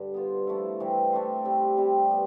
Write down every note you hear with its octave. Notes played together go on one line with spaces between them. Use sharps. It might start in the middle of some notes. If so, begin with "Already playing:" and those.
Already playing: G2 D3
B3 F4 C5
F3 A3 E4
C3 E3 G3 C4
A3 D4 G4 C5
C3 G3 C4
C3 G3 C4 G4
B3